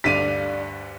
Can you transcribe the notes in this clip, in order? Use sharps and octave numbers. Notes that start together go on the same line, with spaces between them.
D2 G2 D3 D5 E5 F5 B6 D#7